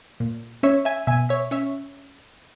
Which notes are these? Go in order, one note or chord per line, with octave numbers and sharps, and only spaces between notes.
A#2
C#4 C#5 E5
E5 G#5
B2 E5 G#5
C#5 E5
C#4 C#5 E5